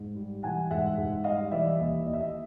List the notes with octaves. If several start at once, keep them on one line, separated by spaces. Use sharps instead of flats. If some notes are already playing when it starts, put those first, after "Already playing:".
Already playing: G#2
G3
E3 F#5 G#5
G#2 E5 F#5
G#2
G3 D#5 F5
E3 D5 E5
D#2 D#5
D#2 D#5
E5
D#5